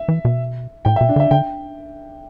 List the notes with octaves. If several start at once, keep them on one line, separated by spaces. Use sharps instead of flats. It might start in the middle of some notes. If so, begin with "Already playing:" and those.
Already playing: E5
E3
B2
A2 G5
E5
B2
D4
D3 E5
D3 G5